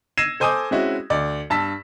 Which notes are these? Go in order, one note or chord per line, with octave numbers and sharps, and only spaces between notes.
E6 G#6 A#6 C7 D#7 E7
A4 C5 G#5 D6 D#6 G6
G#3 C4 C#4 E4 F#4
D2 D5
G2 A5 E6 B6